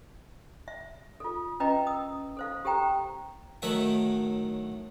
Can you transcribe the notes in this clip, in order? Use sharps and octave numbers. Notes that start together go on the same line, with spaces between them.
E5
F4 A4
C#4 B4 D#5 E5 G5 A#5
A#4 D#6
A4 C5 F5
G4 A4 C5 G5 A#5
A2 D#3 F#3 E5 C#6